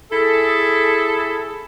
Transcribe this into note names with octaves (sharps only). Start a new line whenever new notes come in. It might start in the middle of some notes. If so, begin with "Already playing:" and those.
E4 G#4 A4